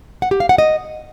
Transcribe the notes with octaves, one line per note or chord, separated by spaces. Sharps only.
F#5
G4
F5
F#5
D#5